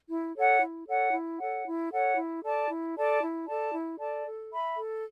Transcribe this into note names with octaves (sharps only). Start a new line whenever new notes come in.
E4
A4 C#5 F#5
E4
A4 C#5 F#5
E4
A4 C#5 F#5
E4
A4 C#5 F#5
E4
A4 D5 A5
E4
A4 D5 A5
E4
A4 D5 A5
E4
A4 D5 A5
A4
E5 B5
A4